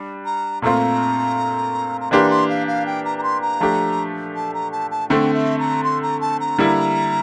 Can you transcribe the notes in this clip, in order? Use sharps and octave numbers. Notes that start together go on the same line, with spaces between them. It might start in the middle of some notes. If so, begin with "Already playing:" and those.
Already playing: G3 D4
A#5
A#2 A3 C4 F4 A#5
A#5
E3 A#3 D4 G4 C6
C6
F5
F5
G5
A#5
A#5
C6
A#5
F3 A3 D4 G4
A5
A#5
A5
A5
D3 A3 C4 G5
E5
A#5
C6
A#5
A5
A#5
D3 G3 A#3 E4